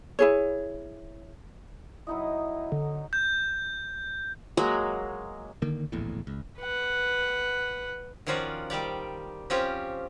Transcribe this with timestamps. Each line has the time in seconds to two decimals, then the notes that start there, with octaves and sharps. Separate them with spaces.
0.19 E4 G#4 C#5
2.07 F#3 D#4 E4 D#5
2.72 D3
3.13 G6
4.57 F#3 G#3 A#3
5.62 D3 D#3 A#3
5.92 D1 A#1 E2 A2
6.27 C#2
6.59 B4 F#5
8.27 D#3 F3 C#4 F4 F#4 D5
8.70 D#3 G3 G4 D5
9.50 F3 C4 C#4 F4 G4